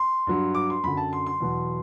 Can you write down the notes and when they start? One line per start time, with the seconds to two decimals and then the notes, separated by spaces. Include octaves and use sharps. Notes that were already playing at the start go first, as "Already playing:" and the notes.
Already playing: C6
0.27 G2 F#3
0.55 D6
0.70 C6
0.84 F#2 D3 F#3 B5
0.97 A5
1.13 C6
1.26 C6
1.40 E2 B2 F#3